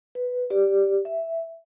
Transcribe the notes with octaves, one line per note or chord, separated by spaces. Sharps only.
B4
G4 D5
E5